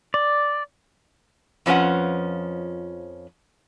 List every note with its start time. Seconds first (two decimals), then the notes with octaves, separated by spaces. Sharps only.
0.14 D5
1.66 F2 F3 C#4 B4 F#5